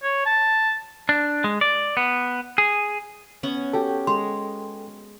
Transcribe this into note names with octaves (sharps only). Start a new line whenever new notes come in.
C#5
A5
D4
G#3
D5
B3
G#4
B3 C#4 F#5
F#4 G4 A4 G5
G#3 C6